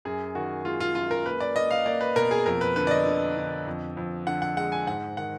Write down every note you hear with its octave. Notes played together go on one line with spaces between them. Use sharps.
F#2 G#4
D#3 F#4
G#3 F4
F4
F#2 F4
A#4
A#3 B4
D5
A#3 D#5
F5
A#3 D5
B4
B2 A#4
G#4
F2 A#4
B4
D3 B4
D5
D#5
D3
D3
F2
F2
D3 F#5
F#5
G#3 F#5
G#5
G#2 F#5
D#3 F#5